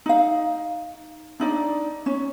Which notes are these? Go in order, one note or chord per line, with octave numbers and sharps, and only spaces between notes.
D#4 F5
D4 D#4 D5
C#4